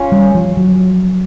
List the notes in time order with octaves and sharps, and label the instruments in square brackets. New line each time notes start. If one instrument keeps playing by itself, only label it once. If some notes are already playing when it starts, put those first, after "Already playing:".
Already playing: [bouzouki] C#4 F4
[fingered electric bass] G3
F3
F#3